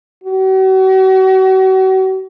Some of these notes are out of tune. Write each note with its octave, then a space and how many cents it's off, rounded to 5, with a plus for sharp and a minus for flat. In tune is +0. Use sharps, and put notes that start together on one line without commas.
F#4 +40